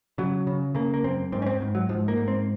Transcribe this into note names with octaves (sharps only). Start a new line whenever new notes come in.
C#3 F#3
C#3
C#3 A#3
A#3
F#2 C4
G#2 C4
C#4
C4
G#2
F#3
G#2 F3
A#3
G#2
C4